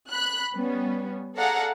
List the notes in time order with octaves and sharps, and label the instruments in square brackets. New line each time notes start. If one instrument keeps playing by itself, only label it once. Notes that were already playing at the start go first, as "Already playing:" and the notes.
[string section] B5 F#6
G3 B3 C#4
G#4 A4 D5 F5 F#5 A#5